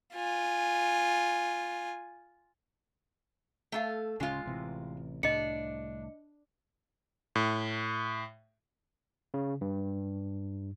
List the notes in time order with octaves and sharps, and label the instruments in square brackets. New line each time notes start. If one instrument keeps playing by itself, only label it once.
[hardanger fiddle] F4 G#5
[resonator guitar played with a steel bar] A3 A4 F5
[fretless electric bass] D1 C#3 C#4 [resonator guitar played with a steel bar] G#3 F4
[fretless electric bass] A1 C3 E3
[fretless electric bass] C2 A2 [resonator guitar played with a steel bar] D4 [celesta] D#5 C#7
[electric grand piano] A2
[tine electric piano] C#3
G2